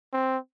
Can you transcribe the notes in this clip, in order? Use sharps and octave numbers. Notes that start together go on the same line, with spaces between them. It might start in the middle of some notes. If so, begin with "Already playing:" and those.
C4